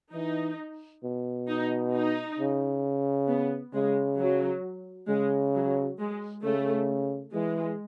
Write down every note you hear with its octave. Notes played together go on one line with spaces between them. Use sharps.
E3 D#4
B2
D#4
D#4
C#3
B3
C#3 G#3
F#3
C#3 G#3
F#3
G#3
C#3 A3
E3 G#3